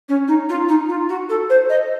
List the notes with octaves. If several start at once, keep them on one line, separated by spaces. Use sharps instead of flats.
C#4
D#4
F4
D#4
F4
F#4
A4
C5
D#5